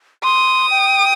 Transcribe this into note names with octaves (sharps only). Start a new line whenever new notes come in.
C6 D#6
G5